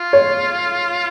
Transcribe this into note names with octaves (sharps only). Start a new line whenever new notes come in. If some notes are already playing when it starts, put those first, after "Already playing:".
Already playing: F4
C#5